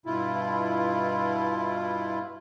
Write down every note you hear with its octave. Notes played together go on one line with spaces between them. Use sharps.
G2 B2 E4 F4